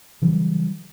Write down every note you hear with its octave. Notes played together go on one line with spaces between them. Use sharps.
C#3 E3 F#3 G3